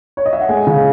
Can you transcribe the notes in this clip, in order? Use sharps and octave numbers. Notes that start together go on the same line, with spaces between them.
C#5
D#5
E5
F#5
G#3 G#5
C#3